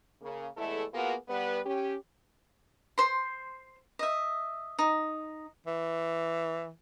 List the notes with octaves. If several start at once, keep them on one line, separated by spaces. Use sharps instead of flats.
C#3 A#3
E2 G#3 A3 E4 A4
A#3 B3 F4 F#4 G#4 A#4
G3 B3 B4
C#4 G4
C5 C6
D#5 E5
D#4
E3